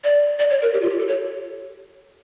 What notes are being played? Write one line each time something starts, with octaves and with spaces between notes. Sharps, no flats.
D5
D5
C#5
A#4
G4
F4
G4
A4
C#5